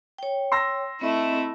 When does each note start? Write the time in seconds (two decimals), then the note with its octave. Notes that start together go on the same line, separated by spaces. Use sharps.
0.18 C#5 G5
0.52 C6 E6 A#6
1.01 A3 C4 E4 D#5